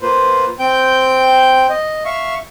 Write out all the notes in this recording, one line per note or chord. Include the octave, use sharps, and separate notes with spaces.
A#3 F4 B4 C5
C4 G5 G6
D#5
E5 F5 C#6